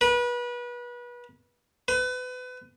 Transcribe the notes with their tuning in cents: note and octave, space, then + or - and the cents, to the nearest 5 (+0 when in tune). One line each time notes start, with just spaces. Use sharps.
B4 -30
B4 +30